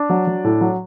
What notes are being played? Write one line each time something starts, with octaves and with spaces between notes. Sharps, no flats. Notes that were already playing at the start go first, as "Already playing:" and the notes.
Already playing: D4
F#3
F#3
A2
F#3